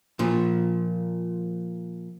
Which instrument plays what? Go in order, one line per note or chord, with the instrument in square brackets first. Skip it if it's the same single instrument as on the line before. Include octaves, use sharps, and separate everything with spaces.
[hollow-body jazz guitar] A#2 F3